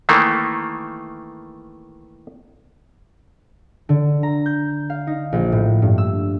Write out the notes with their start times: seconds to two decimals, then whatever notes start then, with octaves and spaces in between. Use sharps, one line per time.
0.09 D#3 E3 A3 A#3
3.89 D3
4.23 A#5
4.46 G6
4.90 F5
5.07 D#4
5.32 A#1
5.52 A2
5.82 G2
5.98 E6